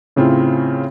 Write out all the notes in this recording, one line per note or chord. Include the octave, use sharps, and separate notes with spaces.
A2 C#3 C4 E4 F4